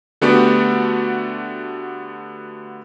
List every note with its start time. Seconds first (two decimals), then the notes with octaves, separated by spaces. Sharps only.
0.21 D3 A3 B3 D4 F#4 G4